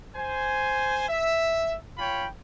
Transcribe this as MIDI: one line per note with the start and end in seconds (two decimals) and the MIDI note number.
0.16 1.05 72
0.16 1.05 80
1.09 1.74 76
1.98 2.26 65
1.98 2.26 73
1.98 2.26 79
1.98 2.26 83